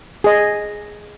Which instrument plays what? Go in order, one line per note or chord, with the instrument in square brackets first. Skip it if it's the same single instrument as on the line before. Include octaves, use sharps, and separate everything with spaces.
[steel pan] G#4 D#5